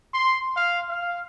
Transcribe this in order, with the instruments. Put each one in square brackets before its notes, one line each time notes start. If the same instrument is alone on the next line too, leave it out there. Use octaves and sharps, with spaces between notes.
[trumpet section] C6
F5
F5